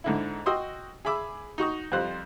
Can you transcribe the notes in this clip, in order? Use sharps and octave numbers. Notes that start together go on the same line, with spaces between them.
G#2 D3 E4
F#4 D#5 G5 C6 D#6 E6
G#4 E5 B5 D6 E6
D#4 F#4 C#6 D#6
F2 G3 F4 C5 F#6